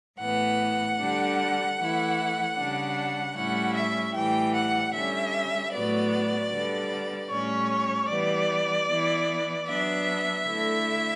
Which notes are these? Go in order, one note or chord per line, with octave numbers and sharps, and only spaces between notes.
A2 E3 B3 F#5
D3 G3 D4
E3 A3 E4
C#3 G3 D4
A2 G3 C#4 E4 F#5
E5
A2 E3 G3 G5
F#5
D3 G3 C#4 E5
A2 F#3 B3 D5
D3 G3 B3
A2 G3 C#4 C#5
E3 G3 B3 D5
E3 B3 E4
F#3 B3 D4 E5
D3 A3 E4